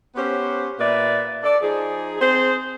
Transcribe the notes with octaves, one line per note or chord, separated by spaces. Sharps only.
B3 C#4 G4 C5
A#2 A#3 B4 D5 E5
A4 D5
F3 D#4 G#4
C4 G#4 C5